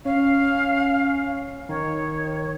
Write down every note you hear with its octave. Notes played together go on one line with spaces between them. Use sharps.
C#4 F5
D#3 C#5